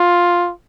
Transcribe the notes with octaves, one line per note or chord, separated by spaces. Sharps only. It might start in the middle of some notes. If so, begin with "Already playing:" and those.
Already playing: F4